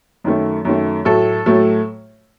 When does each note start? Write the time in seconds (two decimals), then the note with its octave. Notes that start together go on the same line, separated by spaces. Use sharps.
0.24 F#2 D#3 A3
0.65 F#2 D#3 A3
1.05 A2 F#3 A3 A4
1.46 A2 F#3 A3